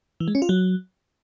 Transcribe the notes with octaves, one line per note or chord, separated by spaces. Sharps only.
E3
G#3
C#4
F4
F#3